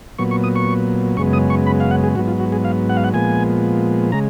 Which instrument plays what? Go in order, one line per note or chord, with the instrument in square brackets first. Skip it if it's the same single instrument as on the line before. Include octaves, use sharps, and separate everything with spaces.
[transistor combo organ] A#2 F#3 B3 C#6
C#6
D#6
C#6
F#2 C#3 G#3 B3 C#6
D#6
C#6
B5
F5
F#5
G#4
G#2 F#3 B3 F#4
F4
F#4
G#4
F5
F#5
F5
F#5
A#2 F3 G#3 B3 G#5
C#3 G#3 A#5